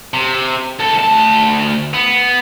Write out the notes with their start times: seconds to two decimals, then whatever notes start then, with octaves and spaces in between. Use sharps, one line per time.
0.14 C3
0.79 C2 A4
0.98 D2 A5
1.94 B3